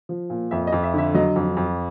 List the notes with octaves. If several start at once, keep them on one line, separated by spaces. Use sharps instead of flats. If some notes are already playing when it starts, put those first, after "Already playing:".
F3
A#2
F2 E5
D#5
F2
E5
D3 E5
F#3 D#5
F2
F2